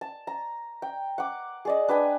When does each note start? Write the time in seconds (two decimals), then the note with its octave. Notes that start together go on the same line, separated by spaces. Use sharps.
0.01 A5
0.27 A#5
0.82 G5
1.18 F#5 D6
1.65 G#4 D5 D#5
1.88 D4 B4 G5 G#5